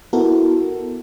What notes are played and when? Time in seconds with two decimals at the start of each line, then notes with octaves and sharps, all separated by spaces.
0.13 B3 E4 F#4 A4 A#4